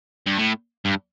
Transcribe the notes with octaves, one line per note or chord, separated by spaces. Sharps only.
G2
A2
G2